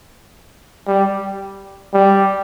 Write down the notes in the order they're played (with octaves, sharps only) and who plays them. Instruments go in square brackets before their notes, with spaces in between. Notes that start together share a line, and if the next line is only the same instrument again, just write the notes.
[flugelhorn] G3
G3